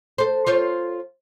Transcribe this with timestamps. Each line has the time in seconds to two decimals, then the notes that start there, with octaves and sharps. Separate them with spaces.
0.18 A4 C5
0.47 F4 C5 C#5